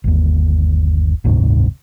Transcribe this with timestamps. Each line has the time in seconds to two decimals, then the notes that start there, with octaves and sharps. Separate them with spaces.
0.04 G1 D#2
1.24 F#1 D2 G#2 C3